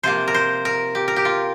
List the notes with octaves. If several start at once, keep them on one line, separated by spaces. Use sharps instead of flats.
C3 F3 A#3 C5
A#4
C5
A#4
G4
A#4
G4
F4